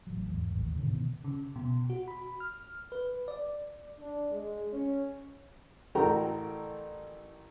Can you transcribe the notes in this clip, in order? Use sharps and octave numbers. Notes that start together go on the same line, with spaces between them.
A1 F#3
E2 G#2
A1 D#2
G#2 B2 D3 D#3
B2 D#3 B3
C#3
B2
F#4
B5
F6
B4
D5
D4
G#3
C#4
A1 F#4 A4 A#4 G5 A#5